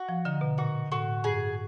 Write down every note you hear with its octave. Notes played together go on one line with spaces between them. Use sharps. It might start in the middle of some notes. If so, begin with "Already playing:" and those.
Already playing: F#4
F3
D3 D#4
B2
A#2 F#4
A2 F#4
G2 G#4